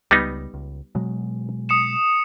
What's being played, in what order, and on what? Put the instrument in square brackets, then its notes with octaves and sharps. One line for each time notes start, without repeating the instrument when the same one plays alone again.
[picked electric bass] C#2 [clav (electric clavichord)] G3 B3 D#4
[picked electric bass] C#2
B2 F#3 G#3
[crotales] D#6 C#7 E7